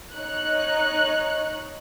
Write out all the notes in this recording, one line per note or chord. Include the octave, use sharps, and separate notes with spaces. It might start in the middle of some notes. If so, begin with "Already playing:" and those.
D#4 C#5 F#6